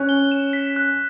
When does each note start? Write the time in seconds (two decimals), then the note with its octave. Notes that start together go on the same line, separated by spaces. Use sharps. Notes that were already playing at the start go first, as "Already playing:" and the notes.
Already playing: C#4 F#6
0.09 G7
0.31 E7
0.53 B6
0.76 F#6